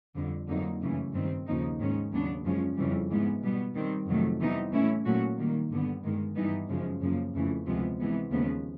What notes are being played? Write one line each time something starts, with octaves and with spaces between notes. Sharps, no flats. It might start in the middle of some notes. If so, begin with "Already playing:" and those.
F2 D3 G3
F2 D3 F#3 A#3 D#4
F#2 C#3 E3 A3
G2 D#3 G3 C4
D#2 C#3 F3 A#3 D#4
G#2 D#3 G#3 C#4
D#2 C#3 F#3 B3 D4
F#2 C#3 F3 G#3 C#4
F2 C#3 E3 G3
G#2 E3 G#3 B3
B2 G3 B3
D#3 G3 C4
F2 C3 D#3 F#3 A3
C3 E3 G3 B3 D#4
A2 E3 A3 C#4 E4
A#2 F#3 A3 C#4 F#4
D#3 G3 A#3
G2 D3 G3 B3
G2 D#3 G#3
G2 E3 G3 B3 D#4
F#2 C#3 F3 G#3
F#2 C#3 F3 A#3
F2 C#3 E3 A3
D2 C3 F3 G#3 B3
C3 E3 G#3 B3
D#2 C#3 F3 G#3 B3